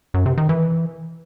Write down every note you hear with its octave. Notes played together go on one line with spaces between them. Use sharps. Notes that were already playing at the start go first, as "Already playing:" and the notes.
F#2
C3
D#3
E3